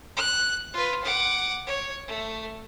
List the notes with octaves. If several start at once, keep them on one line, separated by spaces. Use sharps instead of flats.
F#6
F4 B4
F#5 D6
C#5
A3